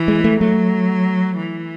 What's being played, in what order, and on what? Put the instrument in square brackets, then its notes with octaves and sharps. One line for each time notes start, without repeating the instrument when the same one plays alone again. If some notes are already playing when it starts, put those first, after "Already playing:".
Already playing: [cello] E3
[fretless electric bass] G#3
A3
[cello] F#3 [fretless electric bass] A3
[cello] E3